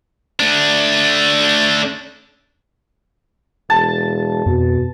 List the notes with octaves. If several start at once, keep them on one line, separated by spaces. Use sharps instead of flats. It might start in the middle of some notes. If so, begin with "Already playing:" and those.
A3 D4
E1 A5
F2 B2